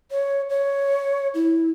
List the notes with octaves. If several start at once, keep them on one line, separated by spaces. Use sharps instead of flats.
C#5
C#5
E4